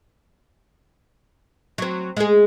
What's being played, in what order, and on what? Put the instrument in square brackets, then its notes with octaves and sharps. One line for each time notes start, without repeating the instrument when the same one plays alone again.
[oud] F#3 C4
G#3 G#4